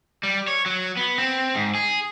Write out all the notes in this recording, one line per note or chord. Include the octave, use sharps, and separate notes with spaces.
G3
C#5
F#3
B3
C4
G#2
G#4